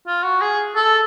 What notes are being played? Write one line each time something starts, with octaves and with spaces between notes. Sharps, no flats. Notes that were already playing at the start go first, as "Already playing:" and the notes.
F4
F#4
G#4
A4